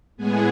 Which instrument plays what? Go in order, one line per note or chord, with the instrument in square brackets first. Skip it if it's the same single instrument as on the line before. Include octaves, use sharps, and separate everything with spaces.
[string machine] A2 G#3 B3 G#4